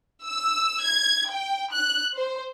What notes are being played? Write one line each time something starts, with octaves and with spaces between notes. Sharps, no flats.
E6
G#6
G5
F#6
C5